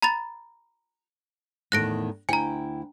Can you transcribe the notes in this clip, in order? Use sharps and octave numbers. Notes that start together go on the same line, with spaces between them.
A#5 B5 A6
E2 A2 D#3 F#6 A#6 D7
D2 E4 G5 G#5 A#5